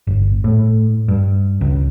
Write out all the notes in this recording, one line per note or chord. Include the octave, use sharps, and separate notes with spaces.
G1
A2
G2
C#2